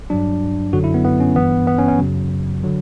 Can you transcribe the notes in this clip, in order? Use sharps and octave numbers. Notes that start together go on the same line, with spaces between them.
G2 F#3 D4
F#2 D3 F#3 F#4
E4
B3
B3
C#4
G2 E3 B3
B3
C#4
C#4
F#2 C#3 F#3
D3 F#3